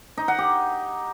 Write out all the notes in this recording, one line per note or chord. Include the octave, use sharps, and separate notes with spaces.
D#4
F#5
G4